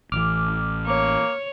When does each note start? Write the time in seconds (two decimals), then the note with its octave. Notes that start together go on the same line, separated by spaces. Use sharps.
0.12 A1 E3 D6 F6
0.87 A#3 C#5